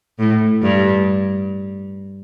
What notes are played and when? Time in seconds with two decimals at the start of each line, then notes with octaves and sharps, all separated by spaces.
0.19 A2
0.62 G2